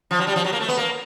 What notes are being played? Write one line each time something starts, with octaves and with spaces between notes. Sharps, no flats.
F3
F#3
G3
F3
F#3
A#3
A3
B3
A#3